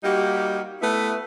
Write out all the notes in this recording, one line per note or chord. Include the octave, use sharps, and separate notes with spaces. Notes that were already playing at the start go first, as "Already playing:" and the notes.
G3 A#3 D#4 F#4 G4
A3 B3 E4 B4